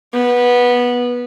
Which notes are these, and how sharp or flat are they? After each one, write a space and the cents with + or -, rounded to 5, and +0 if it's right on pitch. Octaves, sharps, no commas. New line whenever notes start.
B3 -15